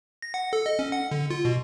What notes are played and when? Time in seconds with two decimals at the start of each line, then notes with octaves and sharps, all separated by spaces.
0.22 A#6
0.34 F#5
0.53 A4
0.66 D#5
0.79 C#4
0.92 F#5
1.11 D3
1.30 F4
1.45 B2